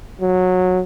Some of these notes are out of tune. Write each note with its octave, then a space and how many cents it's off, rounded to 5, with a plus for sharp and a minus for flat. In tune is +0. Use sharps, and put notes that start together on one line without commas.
F#3 -15